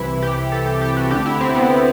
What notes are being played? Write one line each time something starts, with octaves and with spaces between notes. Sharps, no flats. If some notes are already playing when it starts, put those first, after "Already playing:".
Already playing: C2 C3 E3 E4
G4
A4
G4
G4
F#4
D2 D3 G4
E4
C4
B3